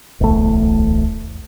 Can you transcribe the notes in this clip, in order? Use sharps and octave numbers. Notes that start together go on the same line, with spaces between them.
D1 B1 E2 A3